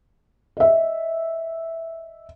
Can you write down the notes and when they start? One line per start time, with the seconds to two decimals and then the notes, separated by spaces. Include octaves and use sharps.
0.57 D#5 E5